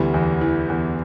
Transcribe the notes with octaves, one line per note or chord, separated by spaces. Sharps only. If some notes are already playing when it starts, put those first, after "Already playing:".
Already playing: D2 E3 G3 B3
E2
E3
E2